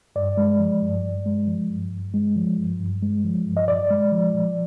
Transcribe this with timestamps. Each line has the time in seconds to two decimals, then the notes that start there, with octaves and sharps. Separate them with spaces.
0.16 G2 D5
0.37 G#3
0.60 F3
0.82 G2
1.04 G2
1.26 G#3
1.47 F3
1.69 G2
1.91 G2
2.14 G#3
2.36 F3
2.57 G2
2.80 G2
3.02 G#3
3.24 F3
3.46 G2
3.57 D#5
3.68 A#2 D5
3.91 G#3
4.12 F3
4.34 A#2